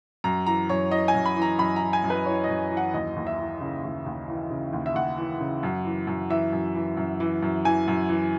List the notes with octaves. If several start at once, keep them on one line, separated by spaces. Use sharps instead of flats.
F#2 A#5
E3 A#5
F#2 C#5
E3 D#5
G#5
F#2
B5
E3 A#5
F#2 B5
E3 A#5
G#5
F#2
B4
E3 C#5
F#2 D#5
E3
F#5
D#2 D#5
D#2
E5
E3
C#3
D#2
D#2
E3
C#3
D#2
E5
D#2 F#5
E3
C#3
F#2
E3
F#2
E3 E5
F#2
E3
F#2
E3
F#2
E3 G#5
F#2
E3